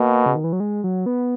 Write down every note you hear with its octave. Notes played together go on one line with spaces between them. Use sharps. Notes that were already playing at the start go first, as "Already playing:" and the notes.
Already playing: B2 A#3
C#3
D#3
E3
F#3
G#3
F#3
B3